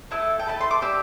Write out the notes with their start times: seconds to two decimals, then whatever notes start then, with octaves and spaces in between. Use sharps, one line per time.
0.11 A3 E4 A4 E6
0.39 G5
0.46 A3 E4 A4 A5
0.61 C6
0.71 D6
0.82 D4 G4 E6